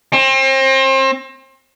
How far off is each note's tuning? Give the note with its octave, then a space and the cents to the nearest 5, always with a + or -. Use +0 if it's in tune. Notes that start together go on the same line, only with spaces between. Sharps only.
C4 +35